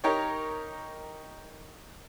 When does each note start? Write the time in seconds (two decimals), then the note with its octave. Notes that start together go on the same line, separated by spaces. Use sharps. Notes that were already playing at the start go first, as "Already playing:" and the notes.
0.04 D#4 G4 A#4 C#5